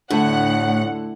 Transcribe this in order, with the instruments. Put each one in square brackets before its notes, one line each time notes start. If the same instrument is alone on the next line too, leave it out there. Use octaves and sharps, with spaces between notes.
[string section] D2 F#5 [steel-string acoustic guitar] A2 [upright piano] D3 A3 A5